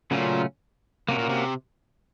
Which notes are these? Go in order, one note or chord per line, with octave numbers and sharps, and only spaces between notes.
A#2 C#3 F#3 A3 C#4 F4
C3 A#3 C#4 F#4 A#4
A#2
C3